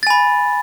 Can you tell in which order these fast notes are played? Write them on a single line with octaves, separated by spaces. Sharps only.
A6 G#5 B5